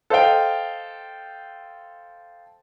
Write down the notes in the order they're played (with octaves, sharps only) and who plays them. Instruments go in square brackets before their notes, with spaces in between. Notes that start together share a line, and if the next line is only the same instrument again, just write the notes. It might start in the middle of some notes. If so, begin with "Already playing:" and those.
[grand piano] A4 C5 D#5 F5 G5